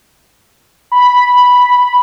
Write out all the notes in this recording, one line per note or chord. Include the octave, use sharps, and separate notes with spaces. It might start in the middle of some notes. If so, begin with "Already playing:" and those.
B5